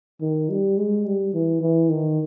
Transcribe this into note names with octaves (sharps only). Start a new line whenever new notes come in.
D#3
G3
G#3
G3
E3
E3
D#3